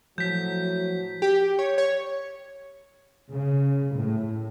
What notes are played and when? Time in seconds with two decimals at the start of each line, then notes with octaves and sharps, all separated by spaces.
0.18 A2 F3 F#3 G6 B6
1.22 G4
1.59 C#5
1.78 C#5
3.31 C#3
3.95 A2